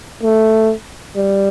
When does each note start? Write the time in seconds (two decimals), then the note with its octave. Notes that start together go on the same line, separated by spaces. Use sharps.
0.23 A3
1.16 G3